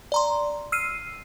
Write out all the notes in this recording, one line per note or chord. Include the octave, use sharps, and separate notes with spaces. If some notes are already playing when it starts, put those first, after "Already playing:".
D5 A#5 C6
E6 F6 C7 D#7